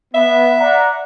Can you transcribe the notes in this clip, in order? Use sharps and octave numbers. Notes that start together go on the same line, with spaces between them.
B3 E5
D5 F#5 A#5